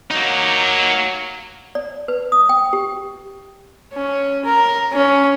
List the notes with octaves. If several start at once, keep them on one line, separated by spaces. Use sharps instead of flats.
F#3 A#3 D#4
D5
B4
D#6
G5
G4
C#4
A#4
C#4